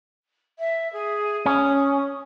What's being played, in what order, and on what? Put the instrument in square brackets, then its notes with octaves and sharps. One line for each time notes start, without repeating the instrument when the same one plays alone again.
[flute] E5
G#4
[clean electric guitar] C#4 [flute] D#6